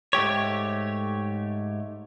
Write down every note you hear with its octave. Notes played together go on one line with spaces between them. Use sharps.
G#2 A3 G4 C#5